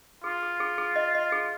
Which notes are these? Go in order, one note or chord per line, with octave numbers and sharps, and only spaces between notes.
F4 G#4
G#4
G#4
G#4
D#5
D#5
G#4